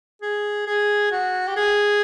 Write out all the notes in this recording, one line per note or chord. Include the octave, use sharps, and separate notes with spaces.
G#4
G#4
F#4
G4
G#4